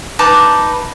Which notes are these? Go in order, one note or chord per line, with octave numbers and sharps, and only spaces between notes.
D#4 B4 A5 D6